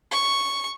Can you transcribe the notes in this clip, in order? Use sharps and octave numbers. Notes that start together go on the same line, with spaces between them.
C#6